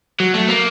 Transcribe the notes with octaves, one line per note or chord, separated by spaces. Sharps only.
F#3
A3
A#3